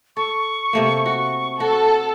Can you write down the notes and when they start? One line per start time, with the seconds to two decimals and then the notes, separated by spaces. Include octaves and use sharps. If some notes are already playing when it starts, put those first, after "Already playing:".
0.17 A4 C#6
0.73 C3 A3 A#3
1.06 F#4
1.60 F#4 A4